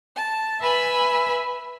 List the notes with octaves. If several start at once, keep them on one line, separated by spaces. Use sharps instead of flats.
A5
B4 E5 G#5 B5